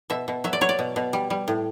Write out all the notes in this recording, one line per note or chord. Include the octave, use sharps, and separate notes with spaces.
B2 E5
B2
F#3 E5
D5
F#3 C#5
D5
B2
B2
G3
G3
A2